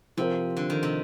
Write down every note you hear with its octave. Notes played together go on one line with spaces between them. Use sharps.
C3 F3 C4 F4 A#4
D3
D#3
C3